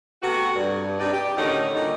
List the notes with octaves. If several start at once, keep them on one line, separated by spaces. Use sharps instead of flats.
C3 A3 B3 F#4
G2
G2 C3 D#4 D5
G4
A2 D3 D#3 C#4 D#4 F#4
A#2 D3 G3 D#4